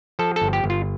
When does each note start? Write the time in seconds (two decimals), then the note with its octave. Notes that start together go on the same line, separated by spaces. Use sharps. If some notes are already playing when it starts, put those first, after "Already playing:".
0.19 F3 A4
0.36 A4
0.42 G1
0.53 G4
0.64 G1
0.70 F4